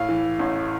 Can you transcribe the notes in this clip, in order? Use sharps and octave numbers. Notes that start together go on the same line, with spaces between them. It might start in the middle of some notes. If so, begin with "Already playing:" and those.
Already playing: A2 F5
E3
A1